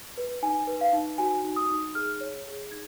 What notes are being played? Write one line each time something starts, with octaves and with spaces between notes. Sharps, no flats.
B4
D#4 G#5
B4
F5
D#4
F#4 G#5
D#4
D#6
D#4
G#4 F6
C#5
G#4
D#4 G#6